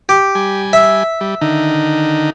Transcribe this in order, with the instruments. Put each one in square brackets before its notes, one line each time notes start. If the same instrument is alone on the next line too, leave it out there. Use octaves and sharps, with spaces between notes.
[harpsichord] G4
[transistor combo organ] G3 G#5
[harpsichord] E5
[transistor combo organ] G3
D3 D#3 D#4